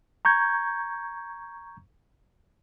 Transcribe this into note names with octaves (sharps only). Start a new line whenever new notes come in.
A#5 C#6 G6 G#6